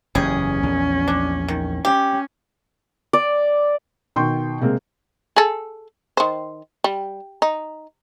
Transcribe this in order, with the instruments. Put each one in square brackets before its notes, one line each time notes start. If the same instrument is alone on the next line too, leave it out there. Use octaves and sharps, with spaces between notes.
[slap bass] F#1 E2 E3 [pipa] G3 G#4 [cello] C#4
[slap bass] A#1 E2
[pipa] D4
D#3
[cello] C#4 [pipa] G4
[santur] D5
[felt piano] B2 D#3 G5 C6 C#6 G6
C3 G#3 A#3 C4
[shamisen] G#4 A4
D#3 C5
G3
D#4